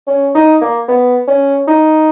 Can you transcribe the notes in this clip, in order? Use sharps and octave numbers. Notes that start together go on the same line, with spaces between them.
C#4
D#4
A#3
B3
C#4
D#4